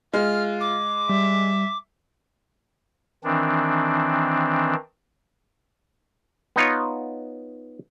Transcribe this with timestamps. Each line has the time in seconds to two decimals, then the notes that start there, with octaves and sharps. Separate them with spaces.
0.14 G#3 F4 F6
0.61 D6
1.10 G3 E5
3.24 D#3 E3 C4 D4
6.56 B3 D#4 F4 C#5